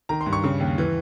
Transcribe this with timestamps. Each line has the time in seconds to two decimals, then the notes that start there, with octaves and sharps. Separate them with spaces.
0.09 D#3 A#5
0.21 C6
0.26 G2
0.33 C#6
0.44 C#3
0.60 D#2
0.78 E3